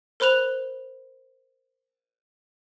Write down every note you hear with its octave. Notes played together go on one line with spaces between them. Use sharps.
A#4 C5 B5 F#6 F7